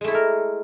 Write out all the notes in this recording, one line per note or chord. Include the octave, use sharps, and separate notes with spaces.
G#3 A3 E4 A4 A#4